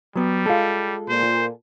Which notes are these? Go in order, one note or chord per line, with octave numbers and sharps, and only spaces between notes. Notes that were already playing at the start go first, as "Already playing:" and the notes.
F#3 G3 B3
G#3 F4 A4
A#2 C5